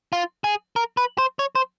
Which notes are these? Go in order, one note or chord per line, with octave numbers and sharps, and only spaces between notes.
F4
G#4
A#4
B4
C5
C#5
C5